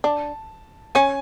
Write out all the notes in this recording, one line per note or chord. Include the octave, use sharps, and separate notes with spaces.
D4 A5
C#4 G#5